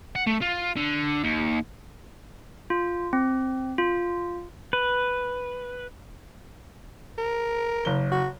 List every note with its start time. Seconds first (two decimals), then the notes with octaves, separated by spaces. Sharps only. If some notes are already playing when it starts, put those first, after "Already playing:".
0.15 F#5
0.27 A3
0.41 F4
0.77 D3
1.24 D#2
2.70 F4
3.13 C4
3.78 F4
4.73 B4
7.18 A#4
7.85 F#1 G7
8.12 F#4